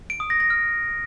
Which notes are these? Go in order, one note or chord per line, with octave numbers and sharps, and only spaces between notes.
D7
D#6
A#6
A#6
F6